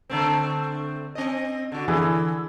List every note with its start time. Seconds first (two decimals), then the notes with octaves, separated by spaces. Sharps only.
0.10 D3 A3 C4
1.15 C4 D#5
1.72 D3 F#4
1.88 D3 E3 E4 G#4